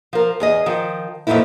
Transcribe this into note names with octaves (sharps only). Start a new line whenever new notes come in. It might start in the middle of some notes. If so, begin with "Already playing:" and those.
F3 A#4
E2 G#4 D#5
D#3 F3
F2 A#2 E3 A3 D#4 E4